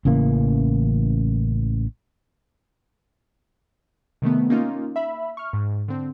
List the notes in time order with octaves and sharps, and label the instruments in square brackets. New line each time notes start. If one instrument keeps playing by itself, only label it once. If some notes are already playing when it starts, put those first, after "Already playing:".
[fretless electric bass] A1 C#3 E3 A#3
[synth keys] C3 D#3 A3 B3
A#3 C#4 D#4 F4
E5 B5
C#6 F6
G#2
D3 C4